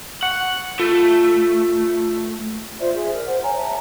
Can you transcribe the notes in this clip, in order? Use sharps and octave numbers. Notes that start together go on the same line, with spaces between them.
F#5 C#6
A3 F4
F4 C5 D5 E5
G#4 E5
A#4 D5
C5 F#5
C#5 G#5 A#5
E5 A5 A#5